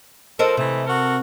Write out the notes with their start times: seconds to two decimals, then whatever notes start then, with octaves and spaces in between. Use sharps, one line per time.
0.39 F3 A4 A#4 C5 D#5
0.57 C3 E3 G#3 A3
0.87 F#4 A4 A#4